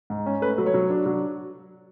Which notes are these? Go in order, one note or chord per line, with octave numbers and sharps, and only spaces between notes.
G#2
C#4
A3 B4
F#3
C#5
F#3
D4
F#3